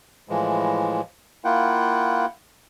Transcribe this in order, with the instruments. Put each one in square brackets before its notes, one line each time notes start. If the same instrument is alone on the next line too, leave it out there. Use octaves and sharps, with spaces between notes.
[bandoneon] A2 E3 F3 G#3
A#3 E4 F4 F#5 G5